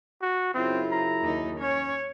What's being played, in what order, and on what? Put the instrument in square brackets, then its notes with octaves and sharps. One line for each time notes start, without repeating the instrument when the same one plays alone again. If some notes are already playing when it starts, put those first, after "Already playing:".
[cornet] F#4
[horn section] F#2 C#3 E4 [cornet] C4 [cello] F4
[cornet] A#5
[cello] D#2 D#4
[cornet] C#4 [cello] C#5